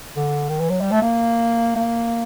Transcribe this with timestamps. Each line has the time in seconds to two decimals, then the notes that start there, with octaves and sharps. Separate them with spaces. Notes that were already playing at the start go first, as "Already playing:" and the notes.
0.17 D3
0.49 D#3
0.60 E3
0.70 F#3
0.81 G3
0.92 A3
1.02 A#3
1.76 A#3